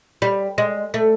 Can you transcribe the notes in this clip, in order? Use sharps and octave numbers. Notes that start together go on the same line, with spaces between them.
G3
G#3
A3